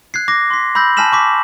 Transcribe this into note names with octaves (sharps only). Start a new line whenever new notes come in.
F#6 G#6 C7
D6 A#6
C6 B6
B5 E6 G6 A#6 F#7
G#5 A5 F6 B6 E7 F#7
C#6 D6 B6